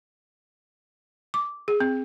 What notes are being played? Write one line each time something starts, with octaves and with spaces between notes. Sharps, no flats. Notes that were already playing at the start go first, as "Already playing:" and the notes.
D6
G#4
C4